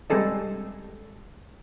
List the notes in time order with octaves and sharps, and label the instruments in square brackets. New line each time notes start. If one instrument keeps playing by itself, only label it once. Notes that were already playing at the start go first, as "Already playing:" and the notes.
[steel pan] G3 G#3 C4 G#4 A4 D#5